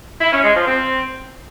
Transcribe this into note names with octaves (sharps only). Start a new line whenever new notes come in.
E4
C#4
G#3
F3
C4